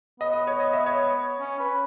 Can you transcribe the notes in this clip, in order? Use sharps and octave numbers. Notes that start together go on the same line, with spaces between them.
B3 D#5
D#5
C#5
D#5
E5
C#5
C#4
B4